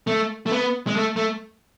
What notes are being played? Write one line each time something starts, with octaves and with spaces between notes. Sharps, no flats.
A3
A3
B3
G#3
A3
A3